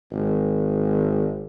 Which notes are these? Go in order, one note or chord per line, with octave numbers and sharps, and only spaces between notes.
G#1